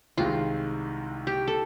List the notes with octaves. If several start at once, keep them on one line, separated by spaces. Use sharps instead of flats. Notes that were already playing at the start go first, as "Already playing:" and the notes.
C2 C3 D#3 G#3 F4
G4
A4